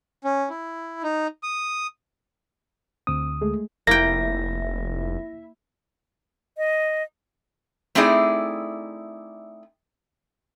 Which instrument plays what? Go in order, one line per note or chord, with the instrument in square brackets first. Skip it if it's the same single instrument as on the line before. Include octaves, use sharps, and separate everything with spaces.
[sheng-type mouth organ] C#4
E4
D#4
D#6
[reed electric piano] D2 D#6 [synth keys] C4
[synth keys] G#3 A3 G#4
[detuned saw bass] F1 [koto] A#3 G5 [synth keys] E4 E5 [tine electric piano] A#6
[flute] D#5
[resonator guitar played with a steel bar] A3 C4 D#4 E4 G#4 D5